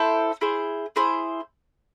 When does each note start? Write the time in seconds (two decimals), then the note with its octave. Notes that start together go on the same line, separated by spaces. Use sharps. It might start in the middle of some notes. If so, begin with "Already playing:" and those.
Already playing: E4 A4 C5
0.41 E4 G#4 C5
0.96 E4 G#4 C5